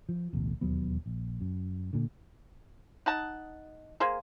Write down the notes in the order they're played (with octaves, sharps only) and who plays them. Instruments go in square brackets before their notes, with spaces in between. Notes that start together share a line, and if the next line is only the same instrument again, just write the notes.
[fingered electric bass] F3
D1 A1 B2
E1 D#2 F#3 B3
A#1
F#2
A#2 D3
[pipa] D#4 F#5 A5
A#3 G#4 C5